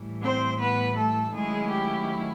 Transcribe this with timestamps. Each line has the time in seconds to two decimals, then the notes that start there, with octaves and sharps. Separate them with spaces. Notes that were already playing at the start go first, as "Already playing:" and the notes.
Already playing: A2 E3 G3
0.22 C4 C5
0.59 B3 B4
0.96 A3 A4
1.34 D#3 F#3 G#3 A3 C#4 E4 G#4
1.71 G4